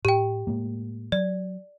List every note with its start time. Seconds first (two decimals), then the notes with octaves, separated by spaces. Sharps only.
0.05 A2 G4 G5
0.47 A2 G#3 A#3
1.12 F#3 D5